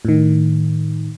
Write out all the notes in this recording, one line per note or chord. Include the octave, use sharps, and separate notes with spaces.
A2 D#3